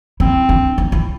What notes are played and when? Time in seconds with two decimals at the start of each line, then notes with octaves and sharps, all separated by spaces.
0.20 C4 E4
0.49 D4
0.78 D#4
0.92 E4